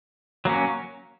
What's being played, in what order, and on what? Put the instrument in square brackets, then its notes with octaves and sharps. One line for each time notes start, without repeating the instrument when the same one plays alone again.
[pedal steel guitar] F#3 A#3 C#4